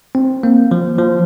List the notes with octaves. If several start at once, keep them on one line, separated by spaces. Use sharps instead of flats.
C4
A#3
F3
F3